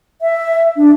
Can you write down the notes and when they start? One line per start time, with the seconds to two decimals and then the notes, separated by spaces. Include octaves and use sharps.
0.22 E5
0.76 D4